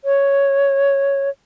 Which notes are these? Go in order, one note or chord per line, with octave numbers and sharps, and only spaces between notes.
C#5